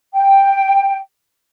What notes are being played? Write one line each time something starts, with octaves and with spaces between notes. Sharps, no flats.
G5